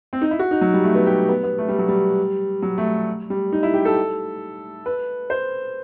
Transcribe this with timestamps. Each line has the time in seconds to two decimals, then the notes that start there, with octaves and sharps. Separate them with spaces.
0.13 C4
0.21 D#4
0.31 E4
0.39 F#4
0.51 D#4
0.61 F#3
0.73 G3
0.84 A3
0.95 B3
1.06 G4
1.29 B3
1.44 B3
1.58 A3
1.68 G3
1.79 F#3
1.88 G3
2.62 F#3
2.78 A3
3.30 G3
3.52 D#4
3.63 E4
3.74 G4
3.85 A4
4.86 B4
5.30 C5